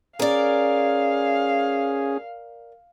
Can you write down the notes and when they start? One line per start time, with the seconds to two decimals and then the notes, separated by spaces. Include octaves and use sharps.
0.19 C#4 G#4 A#4 D5 F5